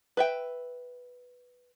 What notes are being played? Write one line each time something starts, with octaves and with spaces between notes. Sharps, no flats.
B4 E5 G5